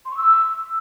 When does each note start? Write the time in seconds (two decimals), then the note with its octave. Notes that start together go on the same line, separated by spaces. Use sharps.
0.05 C6
0.11 C#6
0.17 E6